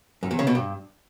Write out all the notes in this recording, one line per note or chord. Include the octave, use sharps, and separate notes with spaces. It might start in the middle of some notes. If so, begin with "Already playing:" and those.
F#2
E2
C#3
B2
G2